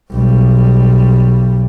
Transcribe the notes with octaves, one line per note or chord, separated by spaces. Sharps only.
B1 G3